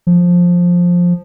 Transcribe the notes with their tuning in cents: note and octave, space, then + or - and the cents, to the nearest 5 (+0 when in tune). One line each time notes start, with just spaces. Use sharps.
F3 +10